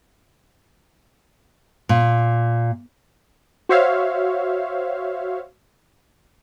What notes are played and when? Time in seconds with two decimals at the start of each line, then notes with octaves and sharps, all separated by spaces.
1.89 A#2
3.69 F#4 C5 C#5 E5 F5